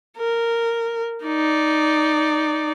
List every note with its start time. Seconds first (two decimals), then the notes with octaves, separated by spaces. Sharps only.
0.18 A#4
1.25 D#4 D5